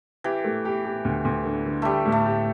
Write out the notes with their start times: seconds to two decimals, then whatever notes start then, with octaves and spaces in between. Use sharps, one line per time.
0.24 E3 G4
0.45 A3
0.65 G4
0.85 G4
1.05 D2
1.25 D2
1.45 D3
1.66 D3
1.82 G3 A3 G4
2.05 A2
2.12 A3
2.26 G4